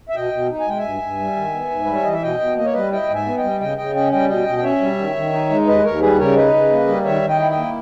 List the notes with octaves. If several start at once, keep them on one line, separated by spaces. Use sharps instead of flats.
E5
B2 D#5 G5
B2
D#4
G#5
G#3 G5
E5 G#5
G2
G2
G3
D#3
B3
G#2
G3 B4
C#5
E3 D#5
E5
B2 D#5 G5
B2
A#3 D#5
C#5
G3 B4 D#5
E4 D#5 G5
G#2
E5 G#5
B3
D#5 G5
G3
C#3 D#5 G5
C#3 D#5 G5
C#4 D#5 G5
G3 D#5 G5
B2 D#5 G5
B2
G5
C#4 C#5 E5
G3
D#3
D#3
D#4
G#3
D#2 B4 D#5
D#2 A#4 C#5
G3 G#4 B4
C#3 A#4 C#5
D#4 B4 D#5
C#3
A#3
G3
D#3 C#5 E5
D#3
D#5 G5
E4
D#5 G5
A#3